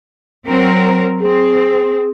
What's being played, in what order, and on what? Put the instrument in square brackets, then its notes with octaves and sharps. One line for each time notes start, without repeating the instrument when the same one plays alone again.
[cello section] F#3 C4 A#4
[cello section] C4 [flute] G#4